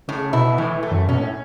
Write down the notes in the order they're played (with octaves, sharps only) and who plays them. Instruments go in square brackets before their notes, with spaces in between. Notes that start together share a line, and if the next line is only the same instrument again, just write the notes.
[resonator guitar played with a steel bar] A2 [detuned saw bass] C#3
[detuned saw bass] B2 [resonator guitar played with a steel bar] E4
[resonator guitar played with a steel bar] A2 [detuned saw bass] E3
[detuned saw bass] E3
[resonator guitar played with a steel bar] A3
[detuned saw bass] F#2
[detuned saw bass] B2 [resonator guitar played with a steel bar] C#4
[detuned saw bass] A2